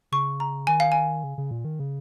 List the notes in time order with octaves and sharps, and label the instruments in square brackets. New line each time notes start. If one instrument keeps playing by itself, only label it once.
[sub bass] C#3 [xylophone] C#6
[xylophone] A#5
[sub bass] D#3 [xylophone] G#5
[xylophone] F5
G#5
[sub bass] C#3
C#3
A#2
D#3
C#3